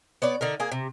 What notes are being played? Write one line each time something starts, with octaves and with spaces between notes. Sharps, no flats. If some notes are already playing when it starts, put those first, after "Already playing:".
B3 C#5 D5
D3 D#4 A#4
A#3 G#4
C3